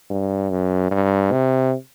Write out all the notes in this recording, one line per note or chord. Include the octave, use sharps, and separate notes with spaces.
G2
F#2
G2
C3